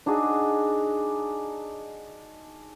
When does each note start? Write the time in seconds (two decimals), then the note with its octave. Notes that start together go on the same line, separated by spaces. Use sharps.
0.06 D4 D#4 F#4 G#4